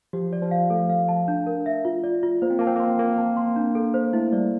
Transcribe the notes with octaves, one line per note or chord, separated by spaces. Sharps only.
F3 G4
D5
F3
F5
A3 A4
F5
A5
D4
A#4
E5
F4
D5
F4
A#3 C5
C4
A#3 A5
C4
A#3 C6
A#3 A#4
A5
C6
D4
A4
C5
A3 E4
G3 D5